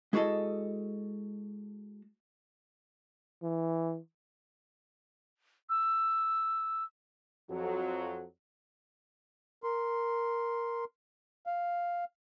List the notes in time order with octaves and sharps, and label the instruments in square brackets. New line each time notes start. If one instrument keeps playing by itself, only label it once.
[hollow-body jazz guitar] G#3 E4 F#4 G#4 A4 D#5
[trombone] E3
[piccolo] E6
[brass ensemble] F2 F#3 [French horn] F#4
[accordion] A#4 C6
F5